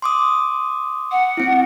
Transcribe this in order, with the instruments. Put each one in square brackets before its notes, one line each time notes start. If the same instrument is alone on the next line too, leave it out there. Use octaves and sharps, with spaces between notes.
[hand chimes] C6 D6 D#6
[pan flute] F#5
[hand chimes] C4 E4